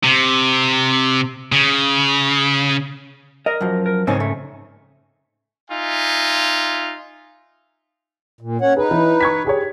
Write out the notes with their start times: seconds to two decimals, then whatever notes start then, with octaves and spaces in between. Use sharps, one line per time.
0.04 C3
1.52 C#3
3.46 A#4 D#5
3.61 F#2 F3
3.86 A#4
4.07 G#2 C#3 C4 C#4 D#4 G#5
4.20 A3
5.70 D#4 F4 E5 G#5
8.41 A#2
8.61 C#4 C#5 F#5
8.77 D#4 G#4 B4
8.91 E3
9.21 C#6 G#6 B6
9.45 G4 G#4 C#5